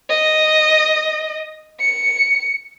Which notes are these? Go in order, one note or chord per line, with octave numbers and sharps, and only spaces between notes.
D#5
C#7